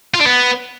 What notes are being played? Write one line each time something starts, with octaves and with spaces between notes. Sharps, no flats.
F4
D4
B3